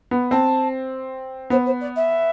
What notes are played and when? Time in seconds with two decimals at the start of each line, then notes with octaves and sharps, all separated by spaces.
0.11 B3
0.31 C4 A5
1.50 B3 C5
1.65 C5
1.80 D5
1.96 E5